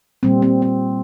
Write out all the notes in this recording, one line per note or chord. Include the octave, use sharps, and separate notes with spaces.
A#2 G3 A#3 C4
C4
C4